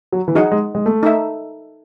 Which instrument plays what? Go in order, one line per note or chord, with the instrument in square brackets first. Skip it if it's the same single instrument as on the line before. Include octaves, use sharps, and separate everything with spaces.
[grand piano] F#3
E3
[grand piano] F#3 [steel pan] D#4 G#4 D#5 F#5
[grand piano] G#3
G#3
A3
[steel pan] D#4 A4 E5